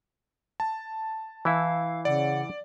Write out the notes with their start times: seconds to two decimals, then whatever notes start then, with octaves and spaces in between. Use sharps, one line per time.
0.60 A5
1.45 E3 E4 F5
2.05 C#3 D5 F#5